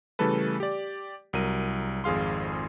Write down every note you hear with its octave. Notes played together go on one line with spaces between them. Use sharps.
C#3 E3 G3 A3 A4 B4
G4 D5
C2 F#3 A#4 D#7
G#1 F2 G#4 F5 C6